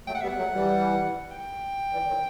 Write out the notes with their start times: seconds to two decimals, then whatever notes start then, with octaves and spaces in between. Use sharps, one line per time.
0.07 F#3 A3 G5
0.15 F#5
0.21 G3 B3 E5
0.28 F#5
0.38 F#3 A3
0.54 E3 G3
1.31 G5
1.93 E3 G3
2.08 D#3 F#3